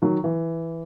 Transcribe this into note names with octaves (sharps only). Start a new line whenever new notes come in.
D#3 F#3 F#4
E3